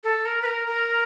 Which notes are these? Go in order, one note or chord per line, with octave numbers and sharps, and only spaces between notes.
A4
A#4
B4
A#4
A#4